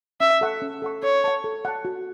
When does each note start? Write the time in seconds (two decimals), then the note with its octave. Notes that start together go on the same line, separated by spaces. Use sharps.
0.20 C#4 E5
0.41 A4 F#5 C#6
0.62 C#4
0.82 A4 F#5 C#6
1.03 A4 C#5
1.24 F#5 A5
1.44 A4
1.65 F#5 A5
1.85 F#4